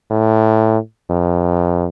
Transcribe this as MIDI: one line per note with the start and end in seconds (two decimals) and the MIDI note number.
0.11 0.78 45
1.10 1.87 41